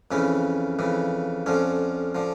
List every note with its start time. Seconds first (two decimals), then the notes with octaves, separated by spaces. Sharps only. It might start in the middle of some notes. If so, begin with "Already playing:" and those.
0.11 F2 C#3 E3 C#4
0.79 F2 C#3 E3
1.46 F2 D3 F3 C#4
2.15 D3 F3